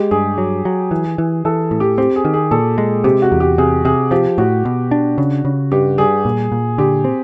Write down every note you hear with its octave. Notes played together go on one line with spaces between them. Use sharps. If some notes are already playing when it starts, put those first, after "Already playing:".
Already playing: G#3 G4
G2 G#4
F#3
F#3
E3
E3
E3 A4
A2
G4
C4 G4
G#4
D#3
G#4
A#2 A4
G#3
C3 G4
F#4
E2
G4
C3 G#4
C3 G#4
F3 G4
A2 F#4
B2
D4
C#3
C#3
G2 G4
G3 G#4
A#2
A#2
D3 G4
C4